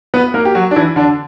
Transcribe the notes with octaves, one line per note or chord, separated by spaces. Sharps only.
B3 B4
A#3 A#4
G4
F#3 F#4
D4
E3 E4
D3 D4